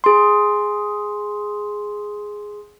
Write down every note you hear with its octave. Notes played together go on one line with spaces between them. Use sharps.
G#4 C6